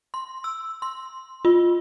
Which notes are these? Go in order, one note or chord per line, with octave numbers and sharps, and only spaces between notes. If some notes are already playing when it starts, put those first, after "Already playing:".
C6
E6
C6
F4